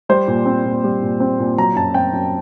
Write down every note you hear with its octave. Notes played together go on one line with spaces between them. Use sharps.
G3 C5
A#2
C4
A#2
G3
A#2
C4
A#2
F#3 A#5
F#2 A5
C4 G5
F#2